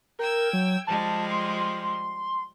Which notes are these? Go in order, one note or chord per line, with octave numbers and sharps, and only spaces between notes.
A#4 G5 E6 G#6
F#3
F3 G3 G#3 A5
C6